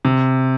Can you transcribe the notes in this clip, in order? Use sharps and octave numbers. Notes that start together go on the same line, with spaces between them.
C3